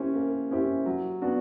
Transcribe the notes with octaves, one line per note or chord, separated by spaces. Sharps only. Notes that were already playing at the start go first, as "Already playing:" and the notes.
Already playing: A#3 C#4 E4 G4 C5
A#3
C#4 E4 G4 C5
F#3
B3 D4 F#4